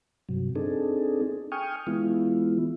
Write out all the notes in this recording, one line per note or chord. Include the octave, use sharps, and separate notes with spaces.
G2 C3 F#3
C4 D4 D#4 G#4 A4
G5 G#5 C#6 D#6 F6
E3 G#3 B3 E4 F4